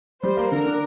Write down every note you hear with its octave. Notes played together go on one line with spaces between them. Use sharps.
G3 C5
A#3
D3 A#4
D4